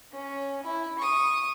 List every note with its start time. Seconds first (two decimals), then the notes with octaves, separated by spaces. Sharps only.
0.12 C#4
0.63 E4
0.98 C#6 D#6